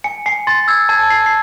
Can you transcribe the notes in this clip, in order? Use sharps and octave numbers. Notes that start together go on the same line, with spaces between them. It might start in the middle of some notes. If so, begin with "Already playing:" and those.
G#5 C#7
G#5 C7
C6 A6
E6 G#6
A5 G#6
A5 C7
C7